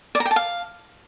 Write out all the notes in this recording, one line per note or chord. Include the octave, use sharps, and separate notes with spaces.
D5
A#5
G5
A5
F5